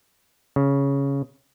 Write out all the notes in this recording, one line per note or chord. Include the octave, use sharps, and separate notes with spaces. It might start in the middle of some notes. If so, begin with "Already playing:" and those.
C#3